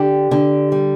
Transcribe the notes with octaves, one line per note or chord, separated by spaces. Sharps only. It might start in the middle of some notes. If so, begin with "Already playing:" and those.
Already playing: D3 G4
D3
G3